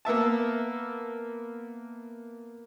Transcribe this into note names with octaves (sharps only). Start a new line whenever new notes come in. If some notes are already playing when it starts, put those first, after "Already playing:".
A#3 B3 E5 A5